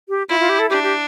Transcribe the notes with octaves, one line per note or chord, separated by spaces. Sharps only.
G4
E4 F4
F4
G4
A4
D4 G4
G4